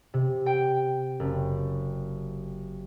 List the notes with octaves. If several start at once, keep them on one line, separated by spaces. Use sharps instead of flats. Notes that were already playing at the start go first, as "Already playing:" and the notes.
C3
G5
F#1